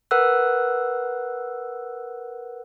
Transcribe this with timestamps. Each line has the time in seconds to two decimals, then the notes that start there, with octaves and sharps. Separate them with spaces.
0.11 A#4 B4 F#5 E6 F#6